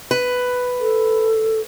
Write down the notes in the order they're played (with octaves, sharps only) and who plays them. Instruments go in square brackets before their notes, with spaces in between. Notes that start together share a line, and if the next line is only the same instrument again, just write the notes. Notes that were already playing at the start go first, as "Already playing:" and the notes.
[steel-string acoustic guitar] B4
[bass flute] A4